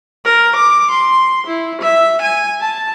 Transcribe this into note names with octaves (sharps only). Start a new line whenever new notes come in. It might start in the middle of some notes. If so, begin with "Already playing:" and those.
A#4
D6
C6
E4
E5
G#5
A5